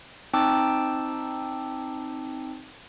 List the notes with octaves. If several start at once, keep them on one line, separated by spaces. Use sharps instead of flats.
C4 D#4 G5 A5 D6 E6